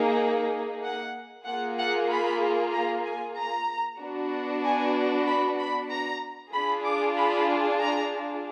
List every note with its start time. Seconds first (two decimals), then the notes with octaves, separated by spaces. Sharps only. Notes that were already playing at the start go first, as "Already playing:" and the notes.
Already playing: A#3 D#4 G#4
0.84 F#5
1.47 A#3 F4 G#4 F#5
1.79 F#5
2.10 B5
2.73 A#5
3.05 G#5
3.38 A#5
4.00 B3 D4 F#4
4.64 G#5
5.27 B5
5.59 B5
5.91 A#5
6.53 D4 F4 G#4 B5
6.86 D6
7.17 B5
7.80 A#5